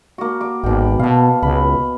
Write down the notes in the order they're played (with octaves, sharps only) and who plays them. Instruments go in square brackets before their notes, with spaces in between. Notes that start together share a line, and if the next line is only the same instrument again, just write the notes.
[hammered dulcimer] A#3 F#4
D6
[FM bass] G#1 [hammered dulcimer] B2 G5
[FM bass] B2 [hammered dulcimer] F5 A5
[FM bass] C#2 [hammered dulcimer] B5